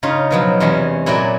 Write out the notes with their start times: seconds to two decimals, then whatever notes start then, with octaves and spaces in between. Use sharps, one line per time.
0.03 C#3 D#4 F4 C#5
0.31 B2 F3 F#3
0.60 E2 C3 G#3 C#4
1.06 A#2 F#3 E4 F#4 D5 G#5